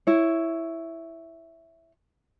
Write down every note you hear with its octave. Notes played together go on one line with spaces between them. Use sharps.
E4 C#5